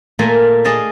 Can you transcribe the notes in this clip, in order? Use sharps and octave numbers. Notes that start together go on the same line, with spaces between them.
A#2 A3 A#3 G#5 A#5
G#4 D5 D#5 F5 G#5 A5